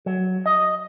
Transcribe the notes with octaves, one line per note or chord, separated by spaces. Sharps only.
F#3
D#5